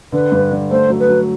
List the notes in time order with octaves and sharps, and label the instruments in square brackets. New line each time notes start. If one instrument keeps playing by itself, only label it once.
[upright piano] D3 [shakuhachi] B4
[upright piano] G2
D3
[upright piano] A3 [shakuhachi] C5
[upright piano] F#3
[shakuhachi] B4
[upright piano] F#3